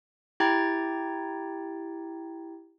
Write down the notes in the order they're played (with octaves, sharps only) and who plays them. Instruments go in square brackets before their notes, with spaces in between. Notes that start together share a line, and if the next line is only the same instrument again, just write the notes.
[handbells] E4 G4 G5 A#5 G#6 A6